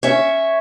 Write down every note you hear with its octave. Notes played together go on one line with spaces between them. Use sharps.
C#4 C#5 E5